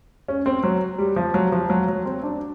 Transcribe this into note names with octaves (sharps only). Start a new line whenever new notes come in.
C#4
C4
F#3
G3
F3
F#3
F3
F#3
F#3
C4
D4